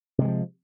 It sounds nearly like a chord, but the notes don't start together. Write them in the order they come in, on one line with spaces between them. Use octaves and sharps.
C3 G#3 E3 F3